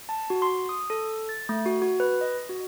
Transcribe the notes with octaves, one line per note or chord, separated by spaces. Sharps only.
A5
F#4
C6
D#6
A4
A6
A3
F#4
F#4
B4
D#5
F#4